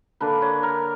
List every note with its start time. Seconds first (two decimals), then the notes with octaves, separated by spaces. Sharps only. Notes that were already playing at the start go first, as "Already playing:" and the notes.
0.20 D3 A#3 D4 B4
0.42 C#5
0.63 A#4